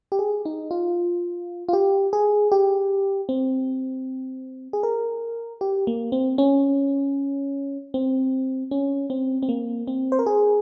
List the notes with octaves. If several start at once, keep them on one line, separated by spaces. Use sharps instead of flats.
G4
G#4
D#4
F4
F4
G4
G#4
G4
C4
G#4
A#4
G4
A#3
C4
C#4
C4
C#4
C4
C4
A#3
C4
C5
A#4
G#4